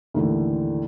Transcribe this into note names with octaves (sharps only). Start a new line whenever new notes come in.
D#2 A2 D3 E3